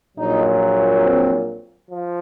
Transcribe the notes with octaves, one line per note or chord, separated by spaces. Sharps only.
A#1 A#2 F#3 D#4
C4
F3